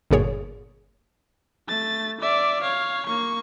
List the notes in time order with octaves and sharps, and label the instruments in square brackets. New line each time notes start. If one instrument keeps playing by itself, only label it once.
[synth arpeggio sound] G1 F#2 A#2 G#4 C#5
[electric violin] A3 A6
D5 E5
C#5 F5
A#3 C#6